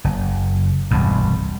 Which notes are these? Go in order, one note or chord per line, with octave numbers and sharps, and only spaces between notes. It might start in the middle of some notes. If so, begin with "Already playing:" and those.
F#1
E1 C2 G2